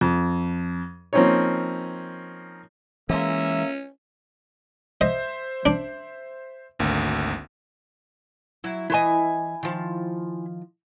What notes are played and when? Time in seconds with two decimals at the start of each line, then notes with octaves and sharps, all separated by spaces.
0.01 F2
1.13 F3 A#3 C4 C#4 D#4 C#5
3.10 E3 G#3 A#3 C#4 E5
5.01 C5 D#5 E5
5.66 D4
6.79 G#1 D2 A#3
8.64 F#3 E4
8.90 E3 E4 C5 D#5 G#5
9.63 D#3 F3